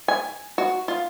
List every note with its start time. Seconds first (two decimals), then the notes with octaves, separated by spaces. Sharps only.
0.08 G#5
0.58 F#4
0.88 F4